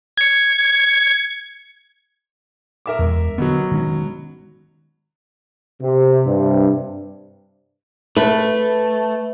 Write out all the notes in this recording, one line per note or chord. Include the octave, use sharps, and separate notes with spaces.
G#6 C#7
A#4 E5 D6
E2 G#3
B2 D3 F#3 B3
D#3 G#3 C#4
C3
G2 C3
A3 B4